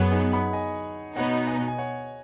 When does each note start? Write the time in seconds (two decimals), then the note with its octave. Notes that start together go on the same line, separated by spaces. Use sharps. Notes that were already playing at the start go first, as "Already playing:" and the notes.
Already playing: F#2 F#3 B3 G#4 C#5
0.11 D#4 G#4
0.33 F#5 B5
0.53 D#5 G#5
1.16 B2 B3 D#4 C#5 F#5
1.47 D#5 G#5
1.68 G#5
1.78 C#5 F#5